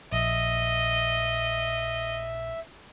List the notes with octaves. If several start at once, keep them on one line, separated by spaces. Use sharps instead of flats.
A#1 D#5 E5